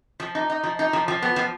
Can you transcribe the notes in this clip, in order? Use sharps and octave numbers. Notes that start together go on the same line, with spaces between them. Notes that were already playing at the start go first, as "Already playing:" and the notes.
F3
D#4
D#4
F3
D#4
F3
F3
B3
F3